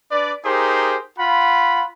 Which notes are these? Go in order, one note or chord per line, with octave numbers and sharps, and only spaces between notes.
D4 B4 D5
D#4 G4 G#4 A#4 C5
F4 F#5 B5